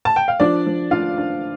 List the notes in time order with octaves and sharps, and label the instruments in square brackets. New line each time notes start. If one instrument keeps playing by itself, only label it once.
[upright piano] A5
G5
F5
F3 D4 D5
F3
D4 F4 F5
D4